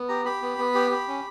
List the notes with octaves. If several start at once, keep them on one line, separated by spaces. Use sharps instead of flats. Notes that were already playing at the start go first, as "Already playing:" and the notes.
Already playing: B3
G4 A#5
G4 B5
B3
B3
G4
G4
C#4